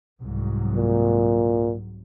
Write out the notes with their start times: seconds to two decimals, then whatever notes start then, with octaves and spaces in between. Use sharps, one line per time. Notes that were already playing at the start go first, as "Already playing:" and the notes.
0.22 C2 G#2 F#3
0.76 A#2